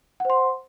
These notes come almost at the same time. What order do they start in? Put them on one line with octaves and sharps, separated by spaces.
F#5 C5 C6